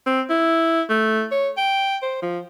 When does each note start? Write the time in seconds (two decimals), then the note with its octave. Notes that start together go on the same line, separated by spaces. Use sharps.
0.06 C4
0.30 E4
0.89 A3
1.31 C#5
1.57 G5
2.02 C5
2.22 F3